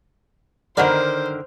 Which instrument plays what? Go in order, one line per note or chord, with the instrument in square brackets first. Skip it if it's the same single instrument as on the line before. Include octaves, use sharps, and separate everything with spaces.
[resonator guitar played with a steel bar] D3 D#3 A#4 [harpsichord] D#4 F#4 D5 [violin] C5